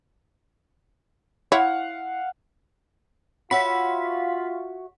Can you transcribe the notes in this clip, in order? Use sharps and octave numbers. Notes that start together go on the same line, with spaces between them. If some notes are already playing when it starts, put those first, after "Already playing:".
E4 C#5 F5 F#5
F4 F#4 C#5 E5 F#5 B5 B6